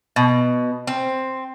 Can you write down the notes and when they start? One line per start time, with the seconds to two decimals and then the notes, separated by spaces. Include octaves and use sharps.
0.16 B2
0.87 C4